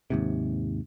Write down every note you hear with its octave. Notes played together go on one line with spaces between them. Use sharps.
D#2 G#2 C3